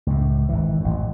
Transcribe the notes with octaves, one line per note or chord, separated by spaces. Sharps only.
C#2 A2
G#1 E3
A1 F#2